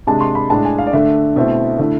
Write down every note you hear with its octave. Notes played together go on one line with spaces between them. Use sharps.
C3 G#3 D4 A5
C6
B5
A2 G#3 D4 A5
G#5
F5
D5
D3 A3 D4 E5
B2 A3 C4 E4
D3 A3 E4